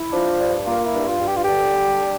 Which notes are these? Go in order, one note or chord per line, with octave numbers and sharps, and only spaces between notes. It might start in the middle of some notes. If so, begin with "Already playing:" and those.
Already playing: E4
F3 D4
G2
A#3 F4
E4
G2
F4
G2
G4
F4
D3 G4
G3
D4